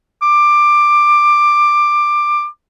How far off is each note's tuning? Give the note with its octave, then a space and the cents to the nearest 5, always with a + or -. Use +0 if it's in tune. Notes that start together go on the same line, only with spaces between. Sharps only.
D6 +15